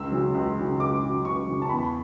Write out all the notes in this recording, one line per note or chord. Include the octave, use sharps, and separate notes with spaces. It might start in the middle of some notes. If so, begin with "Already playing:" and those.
Already playing: C#2 E6
C#3 F#3
C#2
C#3 F#3
C#2 D6
C#3 F#3
C#2 C#6
C#3 F#3
A5
E2 B5